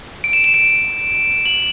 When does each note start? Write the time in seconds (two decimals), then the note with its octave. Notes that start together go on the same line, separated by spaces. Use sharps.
0.24 D7
0.33 E7
0.44 E7
0.54 D7
1.46 F#7